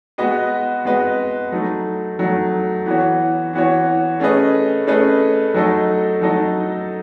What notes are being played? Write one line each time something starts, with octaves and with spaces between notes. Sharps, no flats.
G#3 B3 F#4 B4 D#5
G#3 B3 F#4 B4 D#5
F#3 A3 D#4
F#3 A3 D#4
E3 B3 F#4 C#5
E3 B3 F#4 C#5
A3 C#4 G#4 B4 D#5
A3 C#4 G#4 B4 D#5
F#3 A3 D#4 A4 D#5
F#3 A3 D#4 A4 D#5